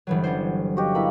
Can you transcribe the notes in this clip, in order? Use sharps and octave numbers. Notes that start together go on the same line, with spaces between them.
G1 E3 F#3
C#4 D4 C5
F#4 G4 D#5
A#3 E4 B4